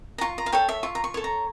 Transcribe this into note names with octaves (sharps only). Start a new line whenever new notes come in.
A#5
F4 C#6
A#5
F5
A4 C#5 G5
E5
F4 C#6
A#5
C#6
A4 C#5
A#5